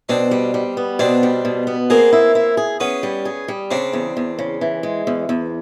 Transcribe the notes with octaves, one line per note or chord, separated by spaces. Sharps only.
B2 C4 D4
G3
G3
B3
B2 C4 D4
G3
B2
B3
A#3 C4 G#4
E4
E4
G#4
B3 C#4 G#4
G3
G#4
G3
C#3 C4 D4
E2
E2
C#3
E3
G#3
E2
E2